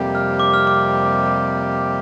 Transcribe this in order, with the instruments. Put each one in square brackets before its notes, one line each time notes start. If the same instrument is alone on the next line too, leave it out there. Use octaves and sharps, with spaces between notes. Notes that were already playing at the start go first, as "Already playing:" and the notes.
Already playing: [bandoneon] F2 C3 G3 A#3 G4
[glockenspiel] F6
D6
F6
D6